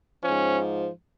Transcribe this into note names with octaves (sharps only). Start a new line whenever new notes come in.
G#2 F3 C#4